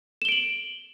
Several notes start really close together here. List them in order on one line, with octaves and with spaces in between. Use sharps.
E7 G7 D7 F#7